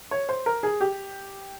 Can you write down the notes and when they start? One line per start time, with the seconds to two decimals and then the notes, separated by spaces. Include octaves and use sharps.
0.11 C#5
0.29 C5
0.46 A#4
0.63 G#4
0.81 G4